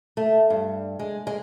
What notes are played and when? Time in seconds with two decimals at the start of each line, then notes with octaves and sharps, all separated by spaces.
0.17 A3
0.50 G2
0.99 G#3
1.27 G#3